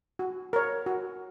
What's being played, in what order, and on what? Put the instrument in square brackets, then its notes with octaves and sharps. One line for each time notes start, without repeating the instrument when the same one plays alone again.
[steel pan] F#4
A#4 C#5
F#4